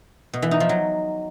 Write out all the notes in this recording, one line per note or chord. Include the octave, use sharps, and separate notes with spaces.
B2
E3
D#4
F3
F#3